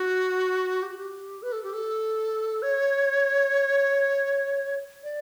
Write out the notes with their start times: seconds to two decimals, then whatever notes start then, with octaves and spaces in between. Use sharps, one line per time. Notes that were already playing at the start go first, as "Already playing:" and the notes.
Already playing: F#4
0.82 G4
0.90 F#4
0.97 G4
1.42 B4
1.52 A4
1.64 G4
1.73 A4
2.62 C#5
5.03 D5